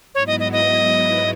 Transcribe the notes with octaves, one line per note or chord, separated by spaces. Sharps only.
G#2 F#3 B3 E4 C#5
D#5
D#5
D#5